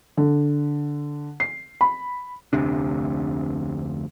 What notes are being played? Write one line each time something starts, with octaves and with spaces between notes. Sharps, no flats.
D3
C7
B5
F1 D2 C3 D4